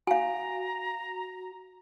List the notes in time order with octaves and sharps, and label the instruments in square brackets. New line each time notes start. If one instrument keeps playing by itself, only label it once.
[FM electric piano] F#4 [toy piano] F5 G#5 [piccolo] A#5